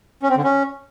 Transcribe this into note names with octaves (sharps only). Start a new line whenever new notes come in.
C#4
C4
D3
C#4